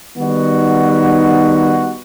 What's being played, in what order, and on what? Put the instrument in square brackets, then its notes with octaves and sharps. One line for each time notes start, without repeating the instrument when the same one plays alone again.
[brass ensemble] D#3 G3 B3 D#4 F#4